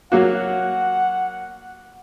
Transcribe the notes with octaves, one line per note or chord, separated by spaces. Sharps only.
F#3 A#3 F#4 F#5